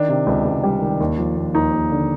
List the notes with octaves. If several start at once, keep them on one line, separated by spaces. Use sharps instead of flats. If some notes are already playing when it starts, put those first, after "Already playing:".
Already playing: D#3 D4
C3
C#2
C#2
G3
D#3
D#2
F3
D#2
D#2 D#4
D#2
D3